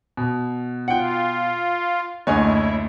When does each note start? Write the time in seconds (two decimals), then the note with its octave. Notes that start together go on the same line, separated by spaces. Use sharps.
0.17 B2
0.88 F4 F#5 G5
2.27 F#1 D2 E4 C#5 D#5 G#5